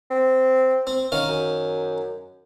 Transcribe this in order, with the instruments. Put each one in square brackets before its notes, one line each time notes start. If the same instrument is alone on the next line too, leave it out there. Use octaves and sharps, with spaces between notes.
[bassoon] C4
[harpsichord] C4
D#3 C#4 F5
[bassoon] F#2